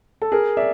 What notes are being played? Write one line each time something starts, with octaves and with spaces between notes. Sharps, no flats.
A4
G#4 A#4
D5 E5